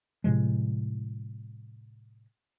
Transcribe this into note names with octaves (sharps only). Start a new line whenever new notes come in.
A2 C3 F3 G#3